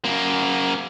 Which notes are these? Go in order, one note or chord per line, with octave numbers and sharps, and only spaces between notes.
F#2 A#3